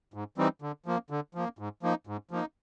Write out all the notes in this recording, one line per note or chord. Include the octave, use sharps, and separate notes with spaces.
G#2
E3 G3 C4 D#4
D3
F3 A#3
D3
F3 A#3
G#2
F3 A#3 D#4
G#2
F3 A#3 D#4